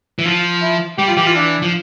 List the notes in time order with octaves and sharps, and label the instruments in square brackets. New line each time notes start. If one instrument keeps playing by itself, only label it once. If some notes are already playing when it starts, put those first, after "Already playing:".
[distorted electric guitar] E3
[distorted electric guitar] F3 [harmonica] F4
[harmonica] E4
[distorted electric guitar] G3 [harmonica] G4
[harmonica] F4
[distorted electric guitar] E3 [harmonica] G4
[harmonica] F4
D4
[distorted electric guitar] F3